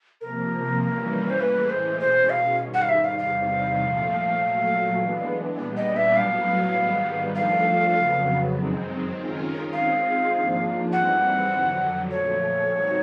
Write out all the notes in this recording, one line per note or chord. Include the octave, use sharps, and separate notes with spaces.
C3 F3 A#3 A#4
E3 G3 A#3 C#4
C5
A2 E3 G#3 B4
C5
B2 G#3 C#4 C5
F5
G#2 D#3 G3
F#5
F5
E5
F5
E2 C3 D#3 G3 F5
A#2 F3 A3
A#2 F#3 A3
E3 G#3 B3 D4
A#2 G3 B3 D4 G4
D#5
E5
A2 F#3 B3 F5
G#2 D#3 G3 B3
F3 A3 D4 F4 A4 F5
F2 C#3 F#3 B3
F#2 D#3 G#3 C4
D#3 G#3 C#4 F4 A#4
D#3 G#3 C4 F4 G#4 F5
G#2 F3 A#3 D4 F4
G#2 E3 G3 C4 F#5
F2 D3 F#3
A#2 F3 A3 C#5
D#3 G3 C4 D#4 F#4